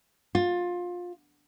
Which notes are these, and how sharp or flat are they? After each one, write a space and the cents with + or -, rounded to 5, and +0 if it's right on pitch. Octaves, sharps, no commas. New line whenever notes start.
F4 +20